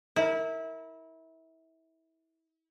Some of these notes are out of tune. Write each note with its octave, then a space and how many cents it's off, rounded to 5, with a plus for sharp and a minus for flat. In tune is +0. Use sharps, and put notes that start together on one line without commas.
E4 -25 A#4 -5